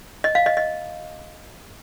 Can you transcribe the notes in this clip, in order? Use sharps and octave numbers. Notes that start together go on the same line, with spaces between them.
D#5
F5
D#5
D#5